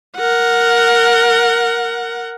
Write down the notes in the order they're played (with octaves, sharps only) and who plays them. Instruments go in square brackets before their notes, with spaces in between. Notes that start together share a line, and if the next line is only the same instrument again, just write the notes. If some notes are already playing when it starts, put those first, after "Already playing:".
[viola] A#4 F#5